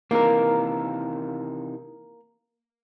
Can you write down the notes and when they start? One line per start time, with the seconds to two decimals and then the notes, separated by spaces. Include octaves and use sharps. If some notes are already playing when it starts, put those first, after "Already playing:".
0.11 C3 D#3 E3 A#3 A#4